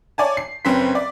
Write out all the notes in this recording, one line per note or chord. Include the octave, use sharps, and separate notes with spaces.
C#5 D5 G#5 A5
C7
F#1 C4 C#4 B4 C6 B6
D5